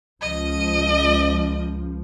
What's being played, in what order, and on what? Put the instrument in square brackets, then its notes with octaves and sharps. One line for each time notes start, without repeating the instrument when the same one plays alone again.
[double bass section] C#2 F3 [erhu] D#5